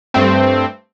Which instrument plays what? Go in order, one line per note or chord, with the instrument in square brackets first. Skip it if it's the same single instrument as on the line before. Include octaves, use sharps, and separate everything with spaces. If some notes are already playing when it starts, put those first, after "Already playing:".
[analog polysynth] G2 A3 C4